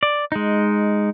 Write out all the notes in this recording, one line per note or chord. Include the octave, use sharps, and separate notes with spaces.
D5
G#3 D#4